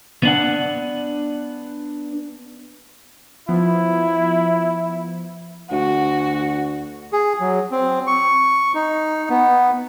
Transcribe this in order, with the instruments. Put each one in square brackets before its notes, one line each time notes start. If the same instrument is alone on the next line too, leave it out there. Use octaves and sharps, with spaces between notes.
[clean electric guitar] B3 D4 F#5
[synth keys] F3 B3 [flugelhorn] E4
[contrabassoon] D2 [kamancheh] F#4
[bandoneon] G#4
F#3
C4
C#6
D#4
B3